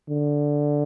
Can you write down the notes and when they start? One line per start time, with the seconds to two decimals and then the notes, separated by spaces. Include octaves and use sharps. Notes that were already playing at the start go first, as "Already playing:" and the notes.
0.09 D3